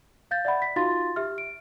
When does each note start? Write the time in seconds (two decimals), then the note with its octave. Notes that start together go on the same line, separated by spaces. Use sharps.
0.31 F5 G6 A6
0.45 D5 E5 F#5 B5
0.62 B6
0.76 D#4 F4 F#4 F5 C6 A6
1.16 G4 E5 F6
1.38 D7